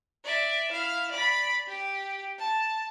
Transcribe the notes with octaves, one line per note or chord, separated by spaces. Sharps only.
D5 E5
E4 F5
D5 B5
G4
A5